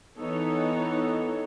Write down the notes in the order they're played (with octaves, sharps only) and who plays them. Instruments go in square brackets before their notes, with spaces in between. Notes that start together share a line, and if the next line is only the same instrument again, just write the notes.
[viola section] E3 B3 D#4 A4 C#5